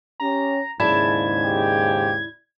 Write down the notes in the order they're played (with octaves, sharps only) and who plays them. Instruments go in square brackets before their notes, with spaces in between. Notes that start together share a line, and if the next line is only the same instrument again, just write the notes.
[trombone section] C#4 G4 [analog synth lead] A#5
[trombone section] D#2 G#2 C#3 [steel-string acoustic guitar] E4 D5 A5 [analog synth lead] G#6
[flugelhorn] G4